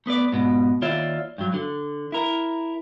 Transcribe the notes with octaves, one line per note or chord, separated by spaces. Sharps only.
A3 B3 B4 D5
G#2 B2
D#2 F4 C#5 D5 E5
G2 F#3
D3
E4 A#4